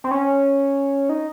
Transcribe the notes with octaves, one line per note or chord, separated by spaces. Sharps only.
C4
C#4
D#4